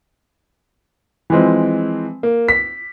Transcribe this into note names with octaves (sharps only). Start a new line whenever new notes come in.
E3 F3 G#3 C4
A#3
B6